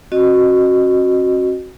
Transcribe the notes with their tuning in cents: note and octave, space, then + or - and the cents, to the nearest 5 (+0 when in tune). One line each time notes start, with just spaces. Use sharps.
C#4 -40 F#4 +0 D#5 -20